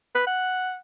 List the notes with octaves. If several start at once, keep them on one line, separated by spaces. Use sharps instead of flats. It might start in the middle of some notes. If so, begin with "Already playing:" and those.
B4
F#5